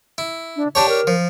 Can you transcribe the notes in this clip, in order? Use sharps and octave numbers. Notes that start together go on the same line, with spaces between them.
E4
D4
D4 G4 C#5 A5
A#4
F3